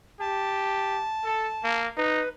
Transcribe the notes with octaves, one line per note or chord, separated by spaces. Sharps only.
G4 A5
A4
A#3
D#4 B4